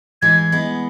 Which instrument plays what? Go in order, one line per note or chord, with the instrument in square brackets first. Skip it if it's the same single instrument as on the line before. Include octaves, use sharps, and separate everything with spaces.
[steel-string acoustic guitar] E3 G#3 [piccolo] G#6
[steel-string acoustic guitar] G#3 B3